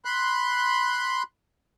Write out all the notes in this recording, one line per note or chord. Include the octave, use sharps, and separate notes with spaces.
B5 C6 F#6